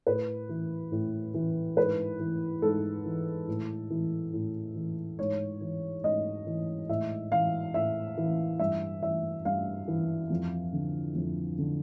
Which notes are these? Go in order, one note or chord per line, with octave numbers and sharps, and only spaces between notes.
A2 B4
E3
A2
E3
G#2 B4
E3
G#2 A4
E3
A2
E3
A2
E3
G#2 C#5
E3
G#2 D#5
E3
A2 E5
E3 F5
A2 E5
E3
G2 E5
E3 E5
G2 F5
E3
F2
D3
F2
D3